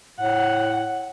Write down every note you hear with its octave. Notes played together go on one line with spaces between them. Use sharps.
A2 F#5